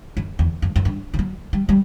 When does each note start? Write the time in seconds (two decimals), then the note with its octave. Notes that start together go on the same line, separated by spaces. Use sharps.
0.17 F#2
0.39 E2
0.62 F#2
0.76 F#2
0.85 G2
1.14 E3
1.19 F#3
1.53 G3
1.69 G3